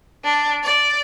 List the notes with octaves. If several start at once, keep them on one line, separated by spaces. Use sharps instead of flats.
D4
D5